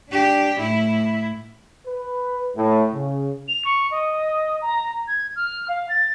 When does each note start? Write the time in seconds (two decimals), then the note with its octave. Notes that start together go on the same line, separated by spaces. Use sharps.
0.11 D4 G4
0.60 A2 E4
1.87 B4
2.56 A2
2.93 C#3
3.48 F7
3.65 C#6
3.91 D#5
4.62 A#5
5.07 G#6
5.36 F6
5.68 F5
5.89 A6